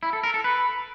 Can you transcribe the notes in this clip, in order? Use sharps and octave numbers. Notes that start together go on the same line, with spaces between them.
E4
A4
A#4
A4
B4